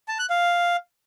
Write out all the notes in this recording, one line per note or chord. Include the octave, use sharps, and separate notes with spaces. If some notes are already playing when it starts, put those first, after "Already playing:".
A5
F#6
F5